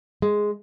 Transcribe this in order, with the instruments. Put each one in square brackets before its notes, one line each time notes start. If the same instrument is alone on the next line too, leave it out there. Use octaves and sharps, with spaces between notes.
[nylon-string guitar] G#3